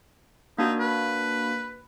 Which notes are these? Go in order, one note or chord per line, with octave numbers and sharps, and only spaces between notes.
A#3 D4 D#4 F#4
B4